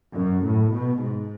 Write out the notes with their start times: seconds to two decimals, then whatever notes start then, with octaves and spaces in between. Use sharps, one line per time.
0.15 F#2
0.44 A2
0.73 B2
1.02 G#2